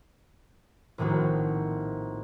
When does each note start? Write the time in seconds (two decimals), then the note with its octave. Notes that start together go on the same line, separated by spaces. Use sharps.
0.98 A#1 A2 D#3 C4 F#4